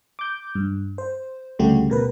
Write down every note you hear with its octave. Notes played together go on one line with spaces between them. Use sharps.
D6 G6
G2
C5
D2 C#3 G3 A3 F#4 G4
B2 A#4 B4